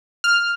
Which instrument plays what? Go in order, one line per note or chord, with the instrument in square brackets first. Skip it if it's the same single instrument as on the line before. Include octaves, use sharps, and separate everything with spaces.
[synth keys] F6